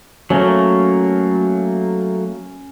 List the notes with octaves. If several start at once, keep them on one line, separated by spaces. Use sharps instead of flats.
F#3 A3 A#3 C#4